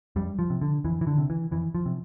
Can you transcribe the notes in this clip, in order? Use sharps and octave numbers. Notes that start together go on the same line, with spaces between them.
F2 G3
F3
C3
D3
F2 E3
E3
D3
C3
E3
F2 E3
F3
C3